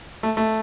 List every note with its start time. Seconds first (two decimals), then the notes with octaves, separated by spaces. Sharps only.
0.23 A3
0.37 A3